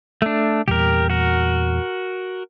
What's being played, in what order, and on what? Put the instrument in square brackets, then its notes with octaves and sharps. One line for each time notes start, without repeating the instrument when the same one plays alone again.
[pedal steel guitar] A3 D4
[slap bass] E2 A#2 G3 [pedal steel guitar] G4 A#4
[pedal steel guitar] F#4 A#4